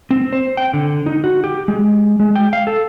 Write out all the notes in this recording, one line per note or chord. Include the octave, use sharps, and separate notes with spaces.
C4
C5
G5
D3
D#4
F#4
G4
G#3
G#3
G5
F5
A4